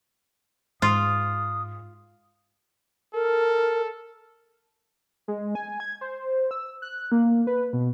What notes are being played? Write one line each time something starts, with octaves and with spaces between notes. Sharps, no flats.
G#2 F4 D#6
A4 A#4
G#3
G#5
G#6
C5
E6
F#6
A#3
B4
B2